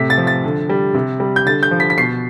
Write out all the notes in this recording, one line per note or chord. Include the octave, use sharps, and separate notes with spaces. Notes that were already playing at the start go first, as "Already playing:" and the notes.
Already playing: A2 C3 B6
A6
F3
A6
D3
G3
C3
G3
G6
D3 A6
G6
F3
B6
B6
B2 C7